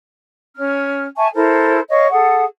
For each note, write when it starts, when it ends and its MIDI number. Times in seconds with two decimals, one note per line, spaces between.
0.56 1.03 61
0.56 1.03 89
1.16 1.27 76
1.16 1.27 80
1.16 1.27 81
1.16 1.27 85
1.34 1.79 64
1.34 1.79 69
1.34 1.79 70
1.34 1.79 72
1.89 2.09 73
1.89 2.09 75
1.89 2.09 77
1.89 2.09 85
2.10 2.43 68
2.10 2.43 69
2.10 2.43 78